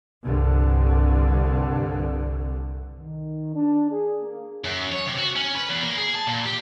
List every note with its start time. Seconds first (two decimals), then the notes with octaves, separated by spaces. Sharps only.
0.23 C2 G2 D3
2.98 D#3
3.54 D4
3.89 G#4
4.22 A#3
4.64 F#2
4.92 C#5
5.07 C3
5.19 F#4
5.36 C#4
5.55 B4
5.69 E2
5.83 A#3
5.97 G#4
6.14 A5
6.26 A#2
6.45 G4